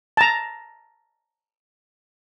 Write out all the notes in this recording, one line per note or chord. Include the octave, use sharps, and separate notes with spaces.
A5 A#5